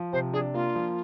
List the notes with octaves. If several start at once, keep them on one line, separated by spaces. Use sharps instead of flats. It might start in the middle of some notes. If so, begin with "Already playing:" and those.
Already playing: F3
C3 C5
D4 G#4
A#3 F4
F3